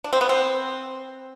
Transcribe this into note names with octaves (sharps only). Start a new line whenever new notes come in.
D4
C4
B3
C4